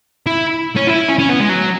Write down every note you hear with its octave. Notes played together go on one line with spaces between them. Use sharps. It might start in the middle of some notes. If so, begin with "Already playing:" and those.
E4
C#4
E4
C#4
C#4
B3
G#3
F#3